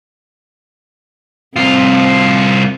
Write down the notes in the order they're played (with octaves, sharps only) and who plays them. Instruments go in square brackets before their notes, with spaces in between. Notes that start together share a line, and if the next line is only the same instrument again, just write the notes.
[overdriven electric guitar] C2 F4 [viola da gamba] C4